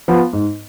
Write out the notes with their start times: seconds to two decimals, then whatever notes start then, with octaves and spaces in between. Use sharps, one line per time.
0.08 F3 B3
0.33 G#2